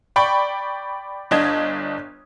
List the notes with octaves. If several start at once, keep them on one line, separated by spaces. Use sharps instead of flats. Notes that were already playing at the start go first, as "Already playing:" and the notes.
D5 G5 B5 C#6
G1 D4 D#5 G#6